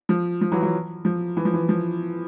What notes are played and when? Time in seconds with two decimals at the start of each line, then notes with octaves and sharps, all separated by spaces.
0.09 F3
0.41 F3
0.52 E3 F#3
0.62 E3 F#3
1.05 F3
1.37 E3
1.45 F3
1.54 E3
1.69 F3